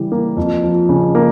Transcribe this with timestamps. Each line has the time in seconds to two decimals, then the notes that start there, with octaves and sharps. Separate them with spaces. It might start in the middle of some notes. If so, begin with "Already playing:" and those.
Already playing: C#3 E3 G3
0.12 A#3
0.37 F2
0.63 F3
0.89 C#3
1.15 A#3